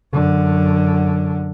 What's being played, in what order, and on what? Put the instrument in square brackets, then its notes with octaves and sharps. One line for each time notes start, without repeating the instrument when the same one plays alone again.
[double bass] F#2 D3